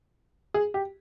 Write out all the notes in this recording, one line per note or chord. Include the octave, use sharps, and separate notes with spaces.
G#4
G4